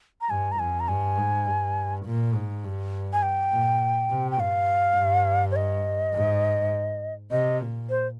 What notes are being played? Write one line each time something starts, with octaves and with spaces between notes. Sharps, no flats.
A#5
G2 G#5
A#5
F2 G#5
A#5
G2 G#5
G#2
G2
A#2
G#2
G2
G#5
G5
A#2
C3
G5
G2 F5
G2
C#5
D#5
G#2
C3 D#5
A#2
C5